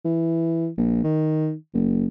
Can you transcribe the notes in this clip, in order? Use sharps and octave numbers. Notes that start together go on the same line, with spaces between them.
E3
A#1
D#3
F#1